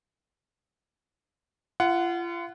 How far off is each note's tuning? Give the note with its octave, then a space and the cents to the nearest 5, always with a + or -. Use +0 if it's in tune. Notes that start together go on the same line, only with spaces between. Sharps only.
F4 -35 F#5 +0